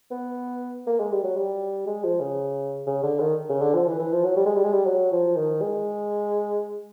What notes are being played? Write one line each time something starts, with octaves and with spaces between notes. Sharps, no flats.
B3
A#3
G#3
G3
F#3
G3
G#3
F3
C#3
C#3
D3
D#3
C#3
D3
F3
E3
E3
F3
F#3
G3
G#3
G3
G#3
G3
F#3
F3
D#3
G#3